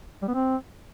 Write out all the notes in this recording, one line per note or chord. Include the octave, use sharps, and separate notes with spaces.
G3
B3
C4